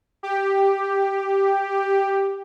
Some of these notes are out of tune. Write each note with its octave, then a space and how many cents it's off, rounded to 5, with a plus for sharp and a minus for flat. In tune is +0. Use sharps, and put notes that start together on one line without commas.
G4 +5